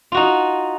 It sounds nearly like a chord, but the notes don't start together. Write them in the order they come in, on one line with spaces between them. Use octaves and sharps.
F4 F#4 D#4